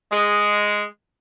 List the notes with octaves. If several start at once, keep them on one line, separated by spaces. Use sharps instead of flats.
G#3